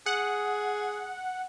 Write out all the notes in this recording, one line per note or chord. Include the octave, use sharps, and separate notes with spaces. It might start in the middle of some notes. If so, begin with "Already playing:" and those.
G#4 F#5